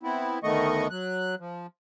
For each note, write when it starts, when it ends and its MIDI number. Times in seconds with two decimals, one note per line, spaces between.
0.03 0.39 59
0.03 0.39 60
0.03 0.39 64
0.43 0.88 38
0.43 0.88 51
0.43 0.88 57
0.43 0.88 59
0.43 0.88 75
0.43 0.88 85
0.90 1.35 54
0.90 1.35 90
1.40 1.67 53